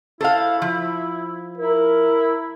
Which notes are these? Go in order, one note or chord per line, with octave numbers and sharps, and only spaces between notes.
E4 A4 C5 F5
F3
E4 A#4